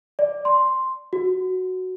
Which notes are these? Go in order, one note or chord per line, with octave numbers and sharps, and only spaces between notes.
D5
C6
F#4